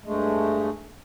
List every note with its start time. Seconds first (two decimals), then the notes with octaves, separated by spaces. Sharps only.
0.04 G2 G#3 A3